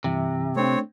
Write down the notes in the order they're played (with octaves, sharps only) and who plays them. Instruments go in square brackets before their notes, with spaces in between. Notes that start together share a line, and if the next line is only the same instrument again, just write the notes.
[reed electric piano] G2 E3 E5 [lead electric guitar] C3
[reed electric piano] A3 D4 [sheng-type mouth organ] C4 C#5